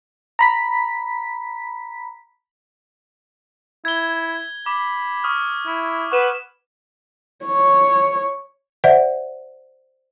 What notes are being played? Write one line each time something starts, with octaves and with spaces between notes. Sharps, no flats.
A#5 B5 B6
E4 G#6 G7
B5 D6
C#6 D#6 F6
E4
B4 F#5 C#6 E7
C#5
C5 D5 E5 F#5